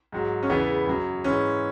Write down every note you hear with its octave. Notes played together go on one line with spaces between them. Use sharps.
G#2 F#3
C#4
E2 C#3 E3 B3
F#2 F#3
G#2 E3 C#4